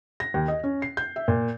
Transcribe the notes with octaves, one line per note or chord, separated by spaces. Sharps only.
A#6
D#2
D#5
C#4
C7
G6
E5
A#2